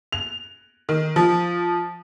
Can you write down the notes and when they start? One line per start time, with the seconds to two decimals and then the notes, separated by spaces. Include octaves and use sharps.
0.12 F7
0.89 D#3
1.16 F3